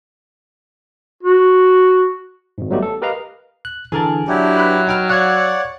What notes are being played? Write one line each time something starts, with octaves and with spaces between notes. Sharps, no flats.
F#4
G#1 G#2
F#3 G3 A3 B3 D#4 G4
A4
G4 A#4 B4 D#5 F5 A#5
F#6
D3 E3 G#4 A#4 A5
F#3 D4 E4 G4
B4 B5 F#6
D#4 G5 F6
C#5 D5 F5 F#5 F#6 G#6